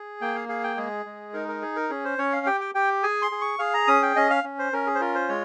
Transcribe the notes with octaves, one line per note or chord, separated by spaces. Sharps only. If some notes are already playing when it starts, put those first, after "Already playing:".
Already playing: G#4
A#3 G5
F5
G#4 F5
G5
G#3 G#4
G#3
D#4 A#4
A#4
G#4
A#4
C#4 G#4
C5
C#4 C#5
F5
G4 G5
G5
G4 G5
G#4 G#5
C6
G#4
C#6
G#4 F5
A#5
C#4 D#6
G5
C#4 D#5
F5
C#4
C5
C#4 A#4
G#4
C5
F4 A#4
C5
G#3 C#5